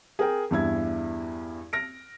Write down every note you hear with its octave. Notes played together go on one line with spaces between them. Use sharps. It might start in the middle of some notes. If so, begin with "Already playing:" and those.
G#4 A#4 G5
E2 G2 E4 G#6
F6 A#6 D7